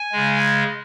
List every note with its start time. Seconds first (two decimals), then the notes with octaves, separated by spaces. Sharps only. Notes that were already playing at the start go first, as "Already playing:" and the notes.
Already playing: G#5
0.12 C#3 G#3